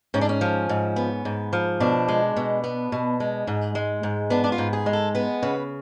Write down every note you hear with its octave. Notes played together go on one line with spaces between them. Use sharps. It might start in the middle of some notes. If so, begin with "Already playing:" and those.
G#2 C#4
D4
C#4
F3
G#2
B3
G#2
F3
B2 D4
G#3
B2
B3
B2
G#3
G#2
G#3
G#2
B3 D4
D4
F4
G#2
G#4
G#3
A4
B3 B4
C#3 B4